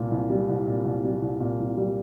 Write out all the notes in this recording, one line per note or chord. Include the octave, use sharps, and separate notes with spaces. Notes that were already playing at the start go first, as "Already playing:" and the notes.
Already playing: C2 A#2
C2
G3
C2
A#2
C2
G3
C2
A#2
C2
G3